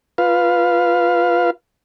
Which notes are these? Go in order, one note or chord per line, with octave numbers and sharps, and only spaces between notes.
F4 B4 F5